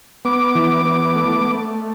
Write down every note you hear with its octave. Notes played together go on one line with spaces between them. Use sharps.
B3 D6
E3
B3
A3
A3